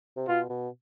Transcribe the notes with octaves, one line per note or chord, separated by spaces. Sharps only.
C3
B2 F4
B2